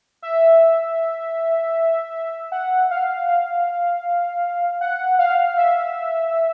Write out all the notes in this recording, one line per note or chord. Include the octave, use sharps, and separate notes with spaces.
E5
F#5
F5
F5
F#5
F5
E5